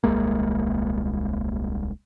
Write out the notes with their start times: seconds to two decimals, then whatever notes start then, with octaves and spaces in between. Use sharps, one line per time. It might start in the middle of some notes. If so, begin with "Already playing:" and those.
0.04 D#1 C2 G#3 A#3